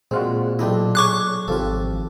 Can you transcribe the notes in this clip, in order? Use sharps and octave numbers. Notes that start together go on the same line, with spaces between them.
A#2 G#3 C4 F4 F#4
B1 D4 E4 G4 D#5
G#4 C#5 C#6 D6 F#6
G#1 C3 F3 F4 G4 A4